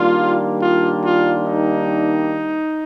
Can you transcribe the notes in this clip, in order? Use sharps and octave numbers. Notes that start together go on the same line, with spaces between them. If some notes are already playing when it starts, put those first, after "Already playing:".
Already playing: D#3 G3 A#3 D4 F4
F4
F4
D#4